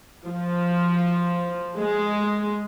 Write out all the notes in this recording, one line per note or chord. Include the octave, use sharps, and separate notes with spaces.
F3
G#3